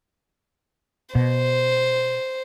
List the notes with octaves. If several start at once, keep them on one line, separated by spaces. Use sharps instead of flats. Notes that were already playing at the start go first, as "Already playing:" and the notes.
B2 C5